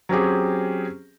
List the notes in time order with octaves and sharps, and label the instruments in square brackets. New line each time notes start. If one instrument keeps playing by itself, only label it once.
[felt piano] F#3 C4 C#4 G4 G#4